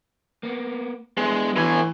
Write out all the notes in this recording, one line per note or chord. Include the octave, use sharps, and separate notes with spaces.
A#3 B3
G#3 B3 D4 E4
A2 E3 G#5